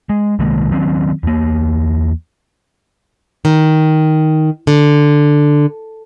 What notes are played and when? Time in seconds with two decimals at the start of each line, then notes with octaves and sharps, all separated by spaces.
0.09 G#3
0.39 C2 D#3 G#3 A#3
0.71 D#3 F#3 C4 C#4
1.23 E2 A#3
3.45 D#3
4.67 D3